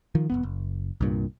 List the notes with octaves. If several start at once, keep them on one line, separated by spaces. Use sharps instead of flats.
D#3 F3
F1 E2 B3
F#1
C2 G2 A#2